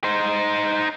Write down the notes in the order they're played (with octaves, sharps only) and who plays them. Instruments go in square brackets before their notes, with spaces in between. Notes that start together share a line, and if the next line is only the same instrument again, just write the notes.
[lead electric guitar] D#4 C5